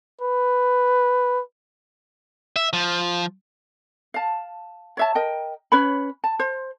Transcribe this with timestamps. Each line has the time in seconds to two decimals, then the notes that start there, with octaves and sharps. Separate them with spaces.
0.21 B4
2.56 E5
2.73 F3
4.14 F5 A5
4.97 C#5 E5 A5
5.15 A#4 D#5 G5
5.72 C#4 B4 C#5 B5
6.24 A5
6.39 C5